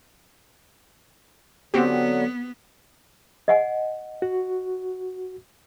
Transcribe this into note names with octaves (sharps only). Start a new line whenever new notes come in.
D3 F#3 B3 C4 F#4 G4
D#5 F#5 G#5
F#4